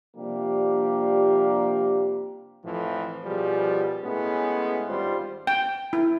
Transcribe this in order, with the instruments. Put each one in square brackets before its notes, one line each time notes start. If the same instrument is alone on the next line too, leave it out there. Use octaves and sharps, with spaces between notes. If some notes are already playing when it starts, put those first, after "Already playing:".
[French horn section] C3 F3 G3 A#3 D4 G4
[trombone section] F2 A2 E3 F3
B2 F3 G3 G#4
A2 G#3 B3 C#4
G#1 G3 F4 C5
[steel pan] G5
E4